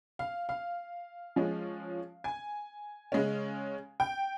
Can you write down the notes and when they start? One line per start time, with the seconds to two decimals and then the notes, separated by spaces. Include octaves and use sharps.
0.19 F5
0.49 F5
1.36 F3 G#3 C#4
2.24 G#5
3.12 C#3 G#3 C#4
4.00 G5